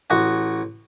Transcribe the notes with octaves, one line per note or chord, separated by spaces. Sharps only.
A1 F#4 G#5